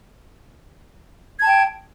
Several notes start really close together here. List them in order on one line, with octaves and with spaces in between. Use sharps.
G#6 A5 G5